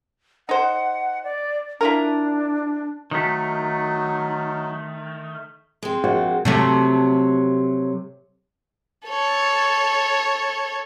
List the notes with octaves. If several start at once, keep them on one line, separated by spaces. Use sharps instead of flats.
D#4 C5 F#5
D5
D4 E4 F4 A#4
D#3 F#3 A3 D#4
G#3 C4
A#1 F#4
C3 F#3 A3
A4 C#5